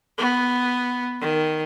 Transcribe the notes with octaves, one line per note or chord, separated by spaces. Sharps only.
B3
D#3